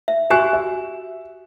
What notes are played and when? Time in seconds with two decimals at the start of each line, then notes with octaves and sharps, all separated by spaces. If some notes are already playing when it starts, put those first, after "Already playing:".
0.08 E5
0.30 F#4 G4 G#5 F#6 E7
0.53 E5